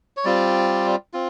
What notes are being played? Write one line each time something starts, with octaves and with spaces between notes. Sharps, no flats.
C#5
G3 C4 F4 D5
C4 F4